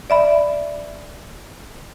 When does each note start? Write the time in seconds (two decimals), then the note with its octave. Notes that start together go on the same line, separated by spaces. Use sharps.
0.10 D5 E5 B5